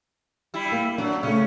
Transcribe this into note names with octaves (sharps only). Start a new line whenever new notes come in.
G3 E4
A#3
F#3 D4
C#3 A3 C#4